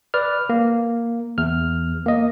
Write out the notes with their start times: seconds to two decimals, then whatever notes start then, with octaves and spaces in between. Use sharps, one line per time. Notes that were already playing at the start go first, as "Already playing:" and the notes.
0.14 B4 D5 F6
0.49 A#3
1.38 E2 F6
2.06 A#3 D#5